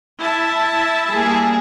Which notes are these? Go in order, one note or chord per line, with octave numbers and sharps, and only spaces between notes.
E4 E5 A5
G3 A#3 G#4